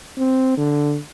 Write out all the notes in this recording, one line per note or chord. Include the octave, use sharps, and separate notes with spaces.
C4
D3